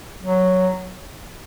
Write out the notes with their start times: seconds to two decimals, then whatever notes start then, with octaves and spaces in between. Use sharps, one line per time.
0.22 F#3